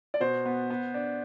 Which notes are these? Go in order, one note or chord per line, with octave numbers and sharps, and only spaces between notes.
D5
B2 C5
B3
B3
D4